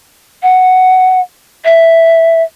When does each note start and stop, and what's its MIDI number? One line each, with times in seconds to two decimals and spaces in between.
0.43 1.20 78
1.65 2.42 76